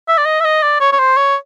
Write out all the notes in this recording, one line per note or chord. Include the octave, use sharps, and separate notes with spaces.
E5
D5
D#5
E5
D#5
D5
C#5
C#5
C5
C#5